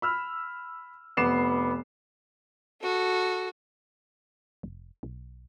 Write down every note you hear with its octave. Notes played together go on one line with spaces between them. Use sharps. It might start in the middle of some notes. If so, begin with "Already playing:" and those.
B5 E6 F6
F1 B3 D6 C7 E7
F#4 A4
F1
B1